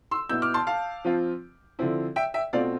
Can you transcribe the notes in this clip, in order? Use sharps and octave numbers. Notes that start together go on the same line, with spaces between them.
C6 E6
B2 B3 E4 E6 G6
D6 F6
A5 C6
F5 A5
F3 C4 F4
D3 F3 C4 E4
E5 G5
E5 G5
B2 A3 C4 F4 D5 F5